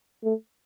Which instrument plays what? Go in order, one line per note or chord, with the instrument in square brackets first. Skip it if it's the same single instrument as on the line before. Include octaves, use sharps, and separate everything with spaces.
[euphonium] A3